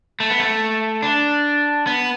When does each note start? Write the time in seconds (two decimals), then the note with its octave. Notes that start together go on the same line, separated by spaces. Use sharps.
0.20 A3
0.30 B3
0.40 A3
1.03 D4
1.87 B3